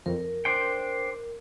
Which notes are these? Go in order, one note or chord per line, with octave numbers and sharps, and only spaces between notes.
F2 A#4
D4 C5 G5